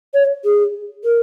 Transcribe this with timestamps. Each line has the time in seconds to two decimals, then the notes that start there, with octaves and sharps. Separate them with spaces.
0.14 C#5
0.45 G#4
1.05 A#4